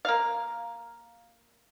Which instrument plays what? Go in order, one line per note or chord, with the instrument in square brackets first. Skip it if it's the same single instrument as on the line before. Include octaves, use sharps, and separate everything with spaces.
[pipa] A#3 F5